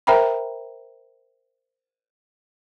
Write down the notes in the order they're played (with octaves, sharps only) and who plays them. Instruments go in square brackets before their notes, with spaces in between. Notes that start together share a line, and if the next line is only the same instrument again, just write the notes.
[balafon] A#4 C5 E5 G5 A#5 B5